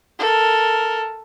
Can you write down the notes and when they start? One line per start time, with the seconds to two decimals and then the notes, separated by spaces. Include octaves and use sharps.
0.19 A4 A#4